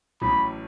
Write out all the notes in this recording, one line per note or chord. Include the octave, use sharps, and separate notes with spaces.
A1 A2 F#3 A3 B5